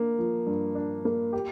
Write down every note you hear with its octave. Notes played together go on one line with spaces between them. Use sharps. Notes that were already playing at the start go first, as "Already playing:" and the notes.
Already playing: A#3 D4
F3
G2
D4
A#3
G4